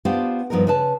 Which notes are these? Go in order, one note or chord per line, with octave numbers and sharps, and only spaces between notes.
B3 D4 F4 G4 C5 F5
G2 F3 B3 D#4 A#4
C#3 B4 A5